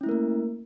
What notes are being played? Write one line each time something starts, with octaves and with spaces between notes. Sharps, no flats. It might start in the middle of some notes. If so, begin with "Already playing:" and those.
A3 A#3 C#4 E4 A#4